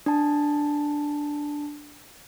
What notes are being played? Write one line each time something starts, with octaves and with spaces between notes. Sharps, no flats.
D4 A5